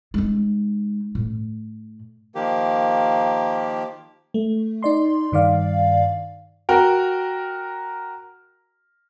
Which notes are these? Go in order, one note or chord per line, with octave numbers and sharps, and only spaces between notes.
G#3 D#4
A2
D#3 F3 A#3 G4
A3
D#4 D5 C6
G2 D#3 D5 F5
F#4 A#4 G5